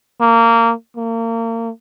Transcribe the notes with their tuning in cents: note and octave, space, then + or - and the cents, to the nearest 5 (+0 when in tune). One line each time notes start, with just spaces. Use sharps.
A#3 -20
A#3 -35